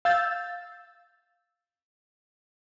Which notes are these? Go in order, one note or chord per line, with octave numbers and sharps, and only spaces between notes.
F5 E6 G6 A6